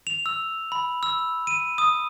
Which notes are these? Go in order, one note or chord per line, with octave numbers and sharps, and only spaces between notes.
F7
E6
B5
E6
D#7
D#6